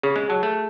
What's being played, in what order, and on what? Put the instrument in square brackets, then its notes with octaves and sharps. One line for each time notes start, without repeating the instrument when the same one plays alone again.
[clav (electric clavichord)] C#3 [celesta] G#4
[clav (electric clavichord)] G#3
[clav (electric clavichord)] F#3 [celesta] A5
[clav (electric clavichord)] A3